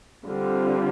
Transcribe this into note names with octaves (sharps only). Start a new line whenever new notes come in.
D3 G3 C4 F4